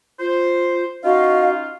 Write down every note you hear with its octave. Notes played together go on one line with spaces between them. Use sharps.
F4 C5
C#4 D#4 F4 F#4 D#5 F5